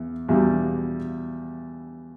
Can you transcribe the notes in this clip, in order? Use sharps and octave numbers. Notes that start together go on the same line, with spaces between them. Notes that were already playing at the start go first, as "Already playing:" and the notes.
Already playing: E2
E2 B2 G3